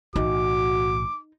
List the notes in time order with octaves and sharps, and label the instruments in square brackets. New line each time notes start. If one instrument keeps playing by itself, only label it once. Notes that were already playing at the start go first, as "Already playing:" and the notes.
[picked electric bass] B1 A2 E3 [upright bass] D#4 [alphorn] F#4 [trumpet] D6